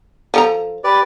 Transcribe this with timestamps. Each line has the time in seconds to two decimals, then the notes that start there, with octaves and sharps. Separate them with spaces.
0.34 F3 A4 A#5
0.84 G4 B4 D5